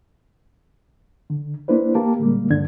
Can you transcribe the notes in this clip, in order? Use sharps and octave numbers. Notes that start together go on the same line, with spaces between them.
D3
A#3 D4 E4 B4 C5
A#3 G4 A5
A#2 D3 G3 G#3 A#3
C#2 G2 D3 D4 G#6